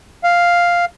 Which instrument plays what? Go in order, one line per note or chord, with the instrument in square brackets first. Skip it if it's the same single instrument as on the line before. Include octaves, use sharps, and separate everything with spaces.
[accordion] F5